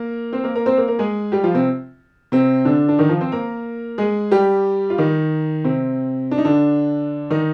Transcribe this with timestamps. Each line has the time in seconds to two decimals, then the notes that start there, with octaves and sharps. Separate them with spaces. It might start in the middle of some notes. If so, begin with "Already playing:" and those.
Already playing: A#3 A#4
0.33 C4 C5
0.44 A#3 A#4
0.55 A#3 A#4
0.66 C4 C5
0.77 A#3 A#4
0.88 A#3 A#4
0.99 G#3 G#4
1.32 G3 G4
1.43 F3 F4
1.54 C3 C4
2.32 C3 C4
2.65 D3 D4
2.89 D4
2.99 D#3 D#4
3.09 F3 F4
3.21 C4 C5
3.32 A#3 A#4
3.98 G#3 G#4
4.31 G3 G4
4.90 F4
4.98 D#3 D#4
5.64 C3 C4
6.31 D4
6.38 D#4
6.45 D3 D4
7.30 D#3 D#4